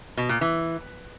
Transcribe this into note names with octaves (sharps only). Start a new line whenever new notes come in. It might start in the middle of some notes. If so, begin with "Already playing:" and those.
B2
A#2
E3